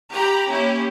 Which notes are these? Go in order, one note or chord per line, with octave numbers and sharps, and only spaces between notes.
G4 A#5 B5
A#3 C#4 E4 G4